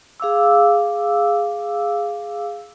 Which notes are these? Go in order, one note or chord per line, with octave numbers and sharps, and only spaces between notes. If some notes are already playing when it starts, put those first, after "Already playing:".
G#4 F5 D6 E6